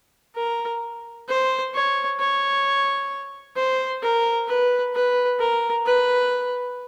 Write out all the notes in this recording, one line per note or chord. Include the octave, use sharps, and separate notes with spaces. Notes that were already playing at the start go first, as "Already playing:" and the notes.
A#4
C5
C#5
C#5
C5
A#4
B4
B4
A#4
B4